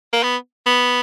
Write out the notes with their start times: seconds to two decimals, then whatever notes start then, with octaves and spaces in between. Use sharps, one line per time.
0.13 A#3
0.23 B3
0.67 B3